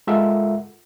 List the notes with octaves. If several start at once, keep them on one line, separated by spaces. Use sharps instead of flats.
G#3 F4 A4 A#4 E5 F#5